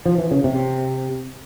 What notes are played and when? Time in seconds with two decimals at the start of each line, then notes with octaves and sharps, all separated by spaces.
0.06 F3
0.18 E3
0.31 C#3
0.44 C3